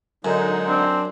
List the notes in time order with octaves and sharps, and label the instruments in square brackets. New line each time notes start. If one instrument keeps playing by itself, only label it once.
[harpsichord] F#2 [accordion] D3 G#3 D#4
[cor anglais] C4 [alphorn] D4